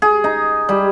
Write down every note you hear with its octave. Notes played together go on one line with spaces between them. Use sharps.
G#4
D#4
G3